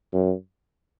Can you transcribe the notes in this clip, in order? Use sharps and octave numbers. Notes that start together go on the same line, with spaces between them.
F#2